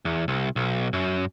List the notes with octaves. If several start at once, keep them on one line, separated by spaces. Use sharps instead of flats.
E2
C2
B1
F#2